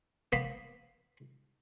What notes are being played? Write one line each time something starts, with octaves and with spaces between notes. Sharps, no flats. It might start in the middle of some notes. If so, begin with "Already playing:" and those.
A#3 B3 B5 C6